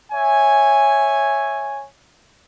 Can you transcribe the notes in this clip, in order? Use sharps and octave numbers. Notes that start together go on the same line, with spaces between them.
C#5 E5 G#5